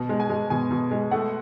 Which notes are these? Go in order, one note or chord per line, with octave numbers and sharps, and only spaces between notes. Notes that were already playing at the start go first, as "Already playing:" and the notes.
Already playing: B2
G#3
G#5
G#3
B2 G#5
B2
G#3
A3 F#5